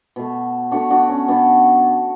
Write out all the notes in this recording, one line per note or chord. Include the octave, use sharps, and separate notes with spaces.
B2 A3
B2 A3 D4 F#4
D4 F#4
C#4
B2 A3 B3 D4